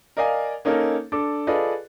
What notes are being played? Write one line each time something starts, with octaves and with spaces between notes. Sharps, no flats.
A#4 D5 D#5 F5 G#5
A#3 C#4 D#4 A4 A#4
D4 A4 D6
F4 G#4 A4 B4 D5 D#5